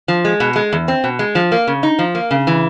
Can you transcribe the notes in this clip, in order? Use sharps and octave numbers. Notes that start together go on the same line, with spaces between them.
F3
G#3
B2
G#3
E2
C4
B2
G#3
F3
A#3
C#3
D#4
F3
A#3
C#3
E3